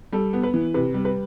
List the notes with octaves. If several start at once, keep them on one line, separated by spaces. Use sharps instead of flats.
G3 A4
B3
B4
E3
C3 B4
G3
B4